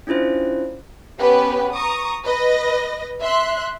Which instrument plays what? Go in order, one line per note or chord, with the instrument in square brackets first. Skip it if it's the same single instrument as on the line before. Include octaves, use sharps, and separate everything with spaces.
[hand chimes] C#4 D4 E4 F4 C5
[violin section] B3 C#4 G4 B4
A#5 C#6 D#6
B4 D#5 A#6
E5 C6 F#6